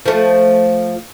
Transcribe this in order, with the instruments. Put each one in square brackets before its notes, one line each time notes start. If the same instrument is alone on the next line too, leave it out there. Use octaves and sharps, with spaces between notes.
[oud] F3 A3